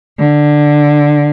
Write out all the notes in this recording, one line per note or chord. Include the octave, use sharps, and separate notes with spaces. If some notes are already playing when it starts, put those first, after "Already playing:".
D3